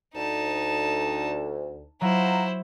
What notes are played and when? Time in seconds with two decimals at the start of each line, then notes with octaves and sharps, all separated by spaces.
0.15 D2 D#4 A5
2.01 F#3 E4 F4 C5 F#5 A#5 E6